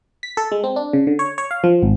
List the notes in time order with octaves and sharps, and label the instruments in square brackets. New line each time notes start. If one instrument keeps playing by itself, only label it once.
[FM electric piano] B6
A4
G#3
C4
D4
C#3
D3
C#5
C#5
F5
F3
G#1